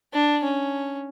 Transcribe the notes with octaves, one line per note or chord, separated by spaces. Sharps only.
D4
C#4